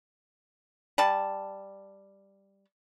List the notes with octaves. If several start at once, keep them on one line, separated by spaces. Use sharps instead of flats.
G3 A5